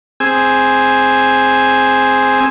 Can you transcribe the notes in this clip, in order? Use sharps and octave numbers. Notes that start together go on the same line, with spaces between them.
C4 G#4 G#5 E6